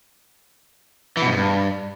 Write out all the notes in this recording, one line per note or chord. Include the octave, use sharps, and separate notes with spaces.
E3
B2
G2
G#2
G2